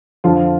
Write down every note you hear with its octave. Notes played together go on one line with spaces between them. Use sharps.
F2 D3 F3 F4